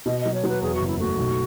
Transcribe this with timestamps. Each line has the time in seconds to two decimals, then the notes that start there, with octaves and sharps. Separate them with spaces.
0.06 B2 D#5
0.20 D#5
0.25 F#3
0.34 C#5
0.44 F#3
0.49 B4
0.62 E2 G#4
0.75 F#4
0.81 F#1
0.87 E4
0.99 A3 F#4
1.18 B1